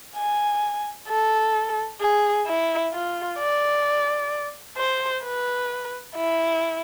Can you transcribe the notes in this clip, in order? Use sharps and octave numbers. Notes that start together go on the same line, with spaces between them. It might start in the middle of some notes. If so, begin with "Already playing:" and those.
G#5
A4
G#4
E4
F4
D5
C5
B4
E4